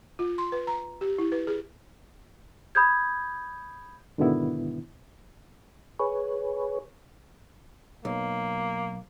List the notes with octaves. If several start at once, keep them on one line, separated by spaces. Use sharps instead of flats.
F4
C6
B4
A#5
G4
E4
B4
G#4
B5 D#6 G6 G#6
G#2 B2 D3 D#3 B3 E4
G#4 B4 C#5
B1 A#3